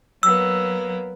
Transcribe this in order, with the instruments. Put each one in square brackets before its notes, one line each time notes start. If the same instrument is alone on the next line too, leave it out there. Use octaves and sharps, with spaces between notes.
[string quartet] F#3 A#3 B3 [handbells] E6